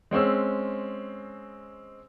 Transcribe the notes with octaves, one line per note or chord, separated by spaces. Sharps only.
G#3 C4 C#4 E6